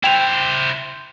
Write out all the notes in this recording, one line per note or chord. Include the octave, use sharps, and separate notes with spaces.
E4 C5 G5 F7